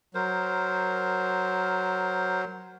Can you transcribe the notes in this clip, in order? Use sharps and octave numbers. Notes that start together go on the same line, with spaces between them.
F#3 A#4 C5